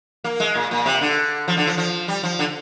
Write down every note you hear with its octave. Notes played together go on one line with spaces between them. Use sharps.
A#3
G#3
A#2
A#2
C3
D3
F3
D3
F3
F3
G3
F3
D3